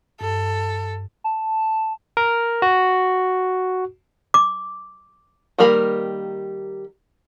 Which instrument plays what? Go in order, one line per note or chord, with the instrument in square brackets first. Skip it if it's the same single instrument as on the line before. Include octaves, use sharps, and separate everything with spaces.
[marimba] G2 [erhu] A4
[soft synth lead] A5
[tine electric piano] A#4
F#4
[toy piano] D6
[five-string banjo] D#3 G3 A#3 A#4 B5